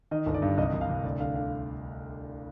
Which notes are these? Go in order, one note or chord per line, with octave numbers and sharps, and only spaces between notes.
D#3 D#5
G1
D5
G2
C2 D#5
C2
F5
C2
D2 D5
D3 F5
D3 F5